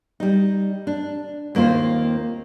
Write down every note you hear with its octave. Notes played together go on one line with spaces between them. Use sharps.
G3 D#4
D4
D#2 A#3 C4 F4 C5